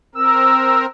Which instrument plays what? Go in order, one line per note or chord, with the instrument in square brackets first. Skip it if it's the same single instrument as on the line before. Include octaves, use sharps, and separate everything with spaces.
[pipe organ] C4 A#4 [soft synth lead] E6